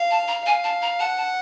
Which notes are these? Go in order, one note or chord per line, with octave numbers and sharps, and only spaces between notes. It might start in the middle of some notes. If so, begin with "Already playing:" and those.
Already playing: F5
A5
A#5
F5 G#5
A5
A#5
F#5 A5
A5